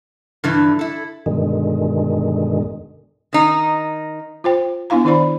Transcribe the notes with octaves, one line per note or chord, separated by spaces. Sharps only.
G2 D3 E3
E4 A4
G2 B2 D3 D#3 G#3
D#3 D#4
F4 C5 G5
B3 D4 E4 F5 A#5
D#3 D4 E4 C5 D5 B5